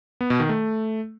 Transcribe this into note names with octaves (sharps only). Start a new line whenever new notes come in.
B3
B2
D#3
A3